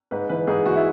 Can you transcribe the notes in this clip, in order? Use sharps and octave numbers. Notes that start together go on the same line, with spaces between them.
G#2 B4
E3 B4
G#2 G#4
E3 F#4
E4